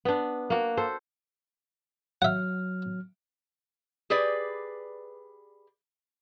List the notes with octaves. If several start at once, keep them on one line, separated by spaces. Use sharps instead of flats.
B3 D4
A#3 F#4
A4 C5
F#3 E5 F#5 F6
G4 G#4 B4 D5